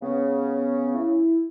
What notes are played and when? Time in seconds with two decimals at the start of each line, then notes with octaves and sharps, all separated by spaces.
0.02 C#3 B3
0.95 E4